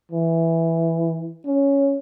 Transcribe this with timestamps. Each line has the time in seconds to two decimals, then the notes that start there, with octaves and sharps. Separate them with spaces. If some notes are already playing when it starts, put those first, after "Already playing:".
0.12 E3
1.45 C#4